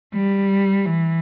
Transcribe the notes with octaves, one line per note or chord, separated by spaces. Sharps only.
G3
E3